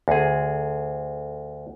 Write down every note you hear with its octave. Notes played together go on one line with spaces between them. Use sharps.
D2 G#4